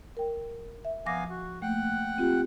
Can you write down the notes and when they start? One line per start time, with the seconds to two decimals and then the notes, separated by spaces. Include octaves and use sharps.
0.17 A#4 G5
0.85 E5
1.06 F3 B3 F5 G#5 D6 A#6
1.30 F#4
1.62 A3 A#3 F#5 G5 F#6
2.18 C4 F4 G4